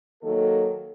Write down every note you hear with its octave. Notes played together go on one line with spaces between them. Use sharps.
D#3 F#3 A#3 A4